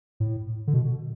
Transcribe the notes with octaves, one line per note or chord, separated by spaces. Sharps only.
A2
D3
B2